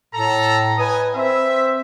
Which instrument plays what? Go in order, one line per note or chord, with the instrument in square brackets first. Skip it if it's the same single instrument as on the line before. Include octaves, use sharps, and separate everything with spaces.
[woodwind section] A2 [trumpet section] A4 A#5
[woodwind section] B4 [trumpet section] D#5 G#5 D#6
[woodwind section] C4 C5 [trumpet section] E5